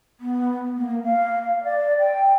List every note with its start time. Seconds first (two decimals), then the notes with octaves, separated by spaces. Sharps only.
0.20 B3
0.78 A#3
1.04 F5
1.42 F5
1.64 D5
2.00 G5